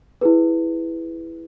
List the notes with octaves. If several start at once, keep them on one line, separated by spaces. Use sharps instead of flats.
E4 G#4 B4